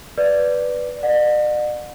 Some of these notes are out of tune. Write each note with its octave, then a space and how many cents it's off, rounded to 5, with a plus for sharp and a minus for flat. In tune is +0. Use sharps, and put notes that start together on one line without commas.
B4 +0 D5 +0
D5 +45 F#5 -30